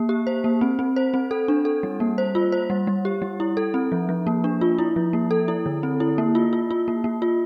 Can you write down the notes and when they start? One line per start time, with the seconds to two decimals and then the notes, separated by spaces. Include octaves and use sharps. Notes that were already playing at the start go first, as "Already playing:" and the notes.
Already playing: A#3
0.09 G4
0.27 C5
0.44 A#3
0.61 C4
0.79 C4
0.96 C5
1.14 C4
1.31 A4
1.48 D4
1.65 A4
1.83 G3
2.00 A#3
2.18 C5
2.35 F4
2.52 C5
2.70 G3
2.87 G3
3.05 G4
3.22 G3
3.40 E4
3.57 A4
3.74 C4
3.92 F3
4.09 F3
4.27 A#3
4.44 D4
4.61 F4
4.79 E4
4.96 F3
5.13 A#3
5.31 A4
5.48 E4
5.66 D3
5.83 C4
6.00 E4
6.18 A#3
6.35 F4
6.53 F4
6.71 F4
6.88 A#3
7.04 A#3
7.22 F4